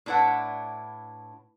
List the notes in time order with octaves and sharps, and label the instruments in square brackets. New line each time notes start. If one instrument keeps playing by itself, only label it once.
[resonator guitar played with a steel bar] A2 D4 E4 B4 F#5